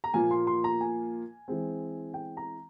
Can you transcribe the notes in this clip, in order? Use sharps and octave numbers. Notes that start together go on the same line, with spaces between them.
A#5
A#2 F3 A#3 F4 G#5
C6
C6
A#5
G#5
E3 G#3 C4
G5
A#5